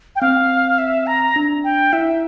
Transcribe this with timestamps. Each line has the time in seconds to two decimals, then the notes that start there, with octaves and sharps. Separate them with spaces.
0.16 G5
0.21 C4 F5
0.78 E5
1.07 A#5
1.36 D4
1.64 G5
1.93 E4 E5